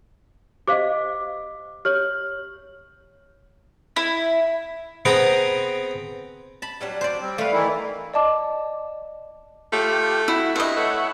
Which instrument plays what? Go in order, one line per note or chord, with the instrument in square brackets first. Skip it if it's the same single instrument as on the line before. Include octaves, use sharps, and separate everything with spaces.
[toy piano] G4 C5 F5 [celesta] D#5 D6
[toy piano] G4 C#5 [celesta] F6
[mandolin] E4
[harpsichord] B3 C4 G#4 G5 A#5
[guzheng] A5 B5
[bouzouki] F#3 G3 D4
[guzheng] C5 D5
[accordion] G3 C4
[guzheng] A3 B4 [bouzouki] D5 [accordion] F5
[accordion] D#3 E3 E4
[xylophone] D5 D#5 A5 D6
[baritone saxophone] A3 [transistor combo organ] F4 G4
[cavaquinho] E4 [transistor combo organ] F#4
[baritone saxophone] G2 [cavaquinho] E4 D#5
[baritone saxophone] A3 [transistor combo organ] C#5 E5 F#5